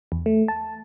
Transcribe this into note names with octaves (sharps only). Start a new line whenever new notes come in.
E2
A3
A5